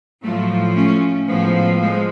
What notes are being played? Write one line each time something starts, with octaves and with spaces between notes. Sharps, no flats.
A2 F3 F#3 A3
A3 C#4
A2 F3 G#3 B3
F3 G#3